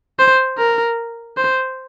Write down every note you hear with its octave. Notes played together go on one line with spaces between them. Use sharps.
C5
A#4
C5